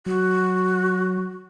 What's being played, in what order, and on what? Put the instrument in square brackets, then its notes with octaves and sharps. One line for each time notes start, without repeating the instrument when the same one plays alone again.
[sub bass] F#3 [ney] F#4